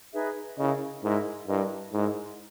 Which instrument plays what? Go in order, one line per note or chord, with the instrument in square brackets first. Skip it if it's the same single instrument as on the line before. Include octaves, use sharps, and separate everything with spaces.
[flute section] D#4 G#4 B4 E5
[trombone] C#3 [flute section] E4 A#4 D#5
[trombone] G#2 [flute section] E4 A#4 D#5
[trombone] G2 [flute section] E4 A#4 D#5
[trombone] G#2 [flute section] E4 A#4 D#5